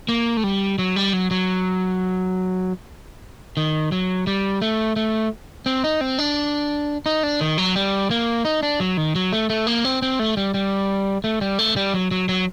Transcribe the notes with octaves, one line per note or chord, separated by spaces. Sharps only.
A#3
A3
G3
F#3
G3
F#3
F#3
D#3
F#3
G3
A3
A3
C4
D#4
C4
D4
D#4
D4
D#3
F#3
G3
A#3
D#4
D4
F#3
D#3
F#3
A3
A3
A#3
C4
C4
A3
G3
G3
A3
G3
A3
G3
F#3
F#3
F#3